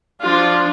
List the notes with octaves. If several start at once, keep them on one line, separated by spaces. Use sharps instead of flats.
F3 D4 F4